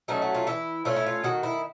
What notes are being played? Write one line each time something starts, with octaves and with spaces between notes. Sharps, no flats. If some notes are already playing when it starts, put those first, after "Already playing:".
F#3 A3 C#4 D#4
F#4
F4
E3 E4
A3 C#4 F4
E4
F4
D#3 F#4
E4